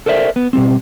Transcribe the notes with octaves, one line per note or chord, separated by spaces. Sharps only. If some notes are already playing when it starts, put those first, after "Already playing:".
A4 A#4 C5 D5 E5
B3
B2 G3 C4